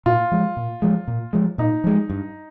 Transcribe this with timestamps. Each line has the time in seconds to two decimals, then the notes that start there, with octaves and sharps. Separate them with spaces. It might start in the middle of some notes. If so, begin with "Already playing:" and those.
0.06 A#2 F4
0.32 F3 G#3
0.57 A#2
0.82 F3 G#3
1.08 A#2
1.33 F3 G#3
1.58 A#2 D#4
1.84 F3 G#3
2.10 G2